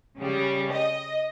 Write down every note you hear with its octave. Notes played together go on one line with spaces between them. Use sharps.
C#3 G3
D#5